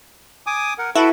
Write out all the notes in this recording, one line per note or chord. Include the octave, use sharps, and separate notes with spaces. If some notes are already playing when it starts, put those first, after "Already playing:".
G#5 D6 D#6
A#4 F#5
E4 F#4 A4 B4